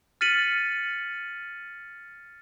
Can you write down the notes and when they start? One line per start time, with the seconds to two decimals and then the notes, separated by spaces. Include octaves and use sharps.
0.21 F6 A6 B6 C#7 D#7 F#7